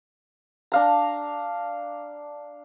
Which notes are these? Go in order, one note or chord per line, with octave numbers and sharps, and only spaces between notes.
D4 F5 A#5